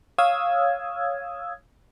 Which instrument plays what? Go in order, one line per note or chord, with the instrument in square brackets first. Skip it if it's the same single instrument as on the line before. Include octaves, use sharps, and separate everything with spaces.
[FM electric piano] C#5 F5 D#6 E6 G#6